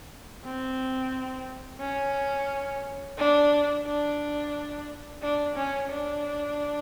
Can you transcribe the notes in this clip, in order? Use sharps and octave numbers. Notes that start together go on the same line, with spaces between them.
C4
C#4
D4
D4
D4
C#4
D4